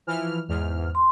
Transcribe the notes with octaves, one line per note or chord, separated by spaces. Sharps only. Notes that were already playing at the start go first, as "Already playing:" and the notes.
E3 F3 F6
E2 G#2 F6
C6